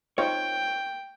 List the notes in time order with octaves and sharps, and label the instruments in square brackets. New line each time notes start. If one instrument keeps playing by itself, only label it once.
[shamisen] C4 D#4 F4 [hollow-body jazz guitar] C#5 [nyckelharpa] G5